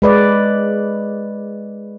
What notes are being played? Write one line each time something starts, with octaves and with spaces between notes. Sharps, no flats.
G#3 B4 D5